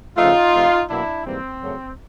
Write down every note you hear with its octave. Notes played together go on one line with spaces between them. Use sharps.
C#3 F3 A3 D#4 F4
C3 F3 A3
B2 F#3 A#3 D4 E4
G#2 E3 G3 A#3 C4
F#2 C#3 F#3 A3